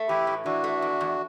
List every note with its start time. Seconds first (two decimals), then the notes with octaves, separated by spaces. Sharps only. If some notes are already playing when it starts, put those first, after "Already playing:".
Already playing: A3
0.09 E3 E4 G4
0.27 A2
0.45 E3 D4 F#4
0.64 A3
0.82 E2
1.01 E2